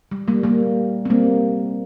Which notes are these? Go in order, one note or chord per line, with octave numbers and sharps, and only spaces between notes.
G3
G3 A#3
G3 A#3
C4
G3 A#3